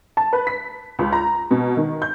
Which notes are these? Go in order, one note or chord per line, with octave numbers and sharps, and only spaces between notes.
A5
B4
B6
C#2
A#5
B2
D#3
G6